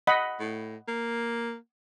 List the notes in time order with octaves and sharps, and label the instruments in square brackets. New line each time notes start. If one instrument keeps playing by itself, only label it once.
[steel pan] D#5 F#5 B5
[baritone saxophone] A2
A#3